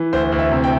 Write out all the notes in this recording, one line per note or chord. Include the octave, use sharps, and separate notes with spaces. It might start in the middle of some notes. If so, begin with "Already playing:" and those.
Already playing: E3
D2 C5
D2
E5
C3
G5